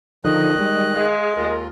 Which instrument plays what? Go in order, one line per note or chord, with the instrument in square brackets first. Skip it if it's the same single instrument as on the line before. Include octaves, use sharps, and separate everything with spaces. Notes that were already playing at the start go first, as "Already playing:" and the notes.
[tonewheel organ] D3 F3 D#4 [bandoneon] D#3 D#5 F#6
[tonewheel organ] G3 G#3
[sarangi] G#3 [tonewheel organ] G#4 F5
[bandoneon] D#2 F4 [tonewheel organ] A#4